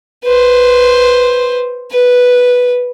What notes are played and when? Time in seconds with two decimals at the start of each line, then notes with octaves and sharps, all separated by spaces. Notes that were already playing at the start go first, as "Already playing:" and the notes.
0.24 B4 C5
1.91 B4